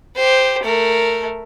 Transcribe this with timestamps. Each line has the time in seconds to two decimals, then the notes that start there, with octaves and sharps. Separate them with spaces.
0.16 G4 C5
0.63 A3 A#4